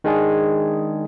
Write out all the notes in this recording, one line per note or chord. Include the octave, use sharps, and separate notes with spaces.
D#3 G#3 D4 G#4